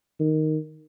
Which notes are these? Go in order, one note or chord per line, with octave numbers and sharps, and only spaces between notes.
D#3